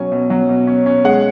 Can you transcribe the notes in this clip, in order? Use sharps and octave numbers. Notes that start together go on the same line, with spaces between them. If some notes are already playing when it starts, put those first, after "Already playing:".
Already playing: B2 F#3 C#4 G#5
B2
F#3
B2
C#4
C#4
G#3 F#5